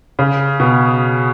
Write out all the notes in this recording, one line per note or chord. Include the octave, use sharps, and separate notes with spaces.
C#3
B2